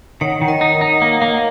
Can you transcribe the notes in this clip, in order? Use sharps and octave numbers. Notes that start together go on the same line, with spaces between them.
D#3 C#5 F#5
D#3
A#4 D#5
D#4
A#4 D#5
D#4
A#3
A#3